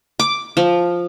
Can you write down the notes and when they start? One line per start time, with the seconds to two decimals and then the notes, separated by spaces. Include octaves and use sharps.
0.19 D6
0.57 F3